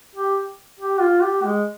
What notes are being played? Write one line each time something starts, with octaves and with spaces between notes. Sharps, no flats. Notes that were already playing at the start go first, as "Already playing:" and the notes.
G4
G4
F4
G4
G#3